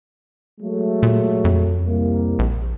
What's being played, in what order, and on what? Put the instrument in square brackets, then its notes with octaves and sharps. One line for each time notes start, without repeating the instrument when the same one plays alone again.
[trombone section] F#3 G#3 A3
[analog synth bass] A#2
F2
[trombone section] C2 G3 A#3
[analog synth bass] A#1